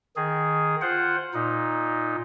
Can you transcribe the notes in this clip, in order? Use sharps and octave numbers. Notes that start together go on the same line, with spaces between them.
D#3 G#4
F4 C5 F#5
A#2 D#4